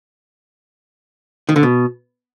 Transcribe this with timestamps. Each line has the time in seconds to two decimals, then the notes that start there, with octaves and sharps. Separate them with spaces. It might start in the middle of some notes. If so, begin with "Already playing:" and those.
1.49 D#3
1.56 D3
1.63 B2